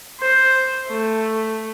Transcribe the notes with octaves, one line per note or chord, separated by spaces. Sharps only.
C5
A3